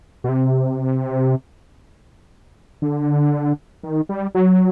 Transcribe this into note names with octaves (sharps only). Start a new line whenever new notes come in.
B2
C3
D3
D#3
G3
F#3